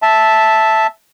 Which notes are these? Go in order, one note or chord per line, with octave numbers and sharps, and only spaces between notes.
E5 A5